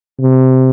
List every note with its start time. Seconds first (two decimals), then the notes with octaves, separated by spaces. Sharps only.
0.20 C3